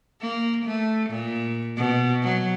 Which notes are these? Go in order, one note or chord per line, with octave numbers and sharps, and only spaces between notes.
A#3
A3
A#2
B2
F#3